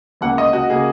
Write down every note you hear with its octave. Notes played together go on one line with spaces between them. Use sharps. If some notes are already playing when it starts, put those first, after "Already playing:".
C#2 C#3 A#3 F#5
D#5
F#4
C#3 A#3 G#4